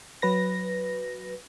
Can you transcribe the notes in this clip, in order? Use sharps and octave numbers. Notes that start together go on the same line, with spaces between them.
F#3 B4 A#6